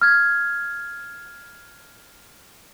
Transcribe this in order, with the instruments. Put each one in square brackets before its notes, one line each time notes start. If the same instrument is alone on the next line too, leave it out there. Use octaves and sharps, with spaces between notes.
[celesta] F6 G#6